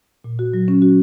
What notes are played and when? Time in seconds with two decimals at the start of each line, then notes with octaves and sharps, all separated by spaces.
0.24 A#2
0.39 F#4
0.54 F#3
0.68 C#4
0.82 F#4